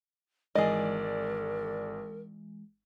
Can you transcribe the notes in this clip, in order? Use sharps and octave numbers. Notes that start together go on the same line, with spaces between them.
G#1 E3 G#3 G#4 A#4 D5 D#5